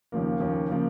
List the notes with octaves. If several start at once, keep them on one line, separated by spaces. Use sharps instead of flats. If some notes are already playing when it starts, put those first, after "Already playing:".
D#2 C#3 F3 A#3
D#2 C#3 F3 A#3
C#3 F3 A#3